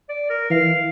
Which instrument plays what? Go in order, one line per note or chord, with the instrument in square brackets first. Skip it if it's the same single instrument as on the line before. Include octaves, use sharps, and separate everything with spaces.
[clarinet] D5
A#4
[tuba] E3 [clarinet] F5